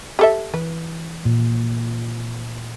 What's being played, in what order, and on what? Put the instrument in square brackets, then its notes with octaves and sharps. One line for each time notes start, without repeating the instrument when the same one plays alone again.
[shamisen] G4 A4 E5
[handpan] E3 [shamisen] B4
[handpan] A#2